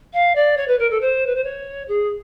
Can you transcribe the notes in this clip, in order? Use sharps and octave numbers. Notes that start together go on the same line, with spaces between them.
F5
D5
C#5
B4
A#4
A4
C5
B4
C5
C#5
G#4